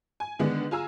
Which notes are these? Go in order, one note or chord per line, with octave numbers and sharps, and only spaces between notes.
G#5
D3 D#3 G#3 B3 D4
F4 G#4 G#5 A#5 E6